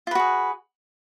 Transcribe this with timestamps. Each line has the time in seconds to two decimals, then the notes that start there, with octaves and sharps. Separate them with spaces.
0.07 F4
0.11 B4
0.15 F#4
0.19 G#4